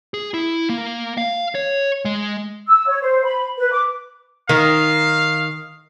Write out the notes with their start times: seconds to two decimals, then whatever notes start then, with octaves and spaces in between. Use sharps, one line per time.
0.14 G#4
0.34 E4
0.69 A#3
1.17 F5
1.55 C#5
2.05 G#3
2.67 E6
2.88 C#5
3.01 C5
3.24 B5
3.57 B4
3.72 D6
4.49 D#3 F5